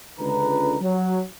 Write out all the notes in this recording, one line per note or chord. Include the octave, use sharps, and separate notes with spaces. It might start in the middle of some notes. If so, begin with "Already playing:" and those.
C#2 D3 B4 A#5
F#3